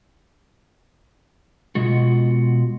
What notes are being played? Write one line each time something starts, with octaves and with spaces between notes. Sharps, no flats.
B2 G#3 F4 F#4